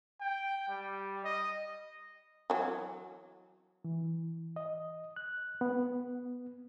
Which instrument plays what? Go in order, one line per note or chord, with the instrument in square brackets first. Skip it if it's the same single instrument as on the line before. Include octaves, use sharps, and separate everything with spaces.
[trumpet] G5
G3
D#5
[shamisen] E3 F#3
[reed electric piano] E3
D#5
F#6
B3